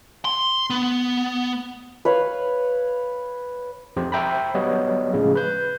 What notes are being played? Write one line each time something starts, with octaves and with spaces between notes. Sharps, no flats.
C6
B3
B4 C#5 F5
F2 G4 C5
C5 E5 G5 A#5 B5
F#3 G3 B3 C#5 D#5
A2 C#3 F3 G#3
B4 G6